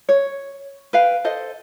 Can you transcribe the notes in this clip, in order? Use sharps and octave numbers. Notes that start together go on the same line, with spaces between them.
C#5
B4 F5 G5
A4 C5 D#5